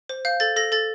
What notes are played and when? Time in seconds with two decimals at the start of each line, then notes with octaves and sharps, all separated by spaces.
0.09 C5
0.25 F5 G6
0.40 A4 A6
0.56 A4 A#6
0.72 A4 A6